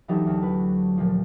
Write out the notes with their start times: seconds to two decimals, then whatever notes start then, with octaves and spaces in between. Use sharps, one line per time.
0.08 E3 F#3 D4 D#4 G4 A4
0.26 D2
0.43 B4
0.97 A#2 F3